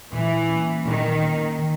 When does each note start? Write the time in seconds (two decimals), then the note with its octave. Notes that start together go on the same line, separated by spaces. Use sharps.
0.12 A#2 E3
0.49 A#3 C#4
0.85 A#2 D#3
1.23 A#3 C#4
1.59 D#3